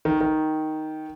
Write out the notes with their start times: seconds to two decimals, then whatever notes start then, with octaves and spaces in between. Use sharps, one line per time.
0.05 D#3
0.21 D#3